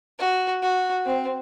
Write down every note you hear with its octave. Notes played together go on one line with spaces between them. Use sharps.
F#4
F#4
C4